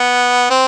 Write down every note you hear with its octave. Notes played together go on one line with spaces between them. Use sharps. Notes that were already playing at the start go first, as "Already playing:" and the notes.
Already playing: B3
C4